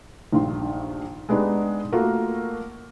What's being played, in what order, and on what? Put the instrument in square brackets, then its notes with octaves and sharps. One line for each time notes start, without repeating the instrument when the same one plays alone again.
[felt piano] A#1 G2 D#3 C6
G#3 B3 D4 D#4 G4
A3 A#3 F4 F#4 A#4